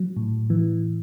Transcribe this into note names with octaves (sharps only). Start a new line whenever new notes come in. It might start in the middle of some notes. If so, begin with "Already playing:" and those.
Already playing: F#3
A2
E3